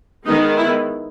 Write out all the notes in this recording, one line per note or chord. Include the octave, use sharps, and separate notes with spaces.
D#3 G#3 B3 D#4
E4